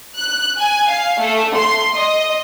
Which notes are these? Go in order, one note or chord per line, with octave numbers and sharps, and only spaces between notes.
F#6
G#5
F5
A3
C6
D#5